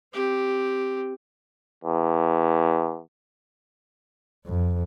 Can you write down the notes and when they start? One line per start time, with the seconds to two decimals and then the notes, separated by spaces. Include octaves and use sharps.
0.13 C4 G4
1.84 E2
4.46 F2